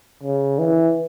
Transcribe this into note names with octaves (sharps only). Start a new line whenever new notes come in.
C#3
E3